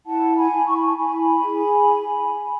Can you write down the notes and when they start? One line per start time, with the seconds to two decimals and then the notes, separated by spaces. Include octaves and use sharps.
0.06 E4 F#5 A5
0.36 G#5 B5
0.51 E4
0.66 C#6
0.76 B5
0.85 A5 C#6
0.96 E4 G#5 B5
1.41 G#4